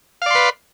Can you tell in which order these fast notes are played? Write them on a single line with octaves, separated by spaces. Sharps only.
F5 D5 C6 B4